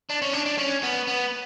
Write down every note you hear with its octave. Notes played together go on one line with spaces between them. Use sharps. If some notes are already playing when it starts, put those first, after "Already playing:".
D4
C#4
D4
D4
C#4
B3
B3